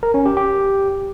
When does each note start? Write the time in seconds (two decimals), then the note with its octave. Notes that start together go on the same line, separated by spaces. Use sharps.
0.03 A#4
0.14 C#4
0.26 G4
0.37 G4